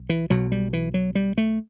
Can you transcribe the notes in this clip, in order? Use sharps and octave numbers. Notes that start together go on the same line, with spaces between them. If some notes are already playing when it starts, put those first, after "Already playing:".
Already playing: B1
E3
B1 B2 F#3
G3
E3
F#3
G3
A3